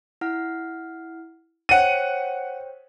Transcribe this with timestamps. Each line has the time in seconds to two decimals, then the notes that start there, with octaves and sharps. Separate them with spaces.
0.21 E4 F#5 F6
1.69 C5 C#5 F#5 G5 D#7